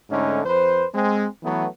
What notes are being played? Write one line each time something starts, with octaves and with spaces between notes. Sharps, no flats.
G#2 D3 A3 C#4 D#4
F2 B4 C5
G#3 C4
E3 F#3 A3 B3